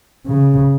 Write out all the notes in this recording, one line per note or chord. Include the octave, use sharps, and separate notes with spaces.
C#3